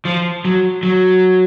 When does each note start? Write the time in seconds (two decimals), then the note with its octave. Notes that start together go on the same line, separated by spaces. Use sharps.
0.05 F3
0.45 F#3
0.83 F#3